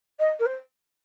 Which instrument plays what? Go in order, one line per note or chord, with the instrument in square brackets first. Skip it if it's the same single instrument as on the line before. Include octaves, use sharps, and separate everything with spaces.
[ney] D#5
A#4
C5